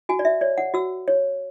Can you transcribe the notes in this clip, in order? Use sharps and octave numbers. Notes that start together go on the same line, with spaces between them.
F#4 G#5
D5
E5
C#5 D5
F#5
F#4 E6
C#5